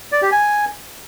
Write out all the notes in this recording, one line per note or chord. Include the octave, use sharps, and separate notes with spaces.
D5
G4
G#5